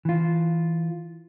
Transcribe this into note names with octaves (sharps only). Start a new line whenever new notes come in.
E3 F4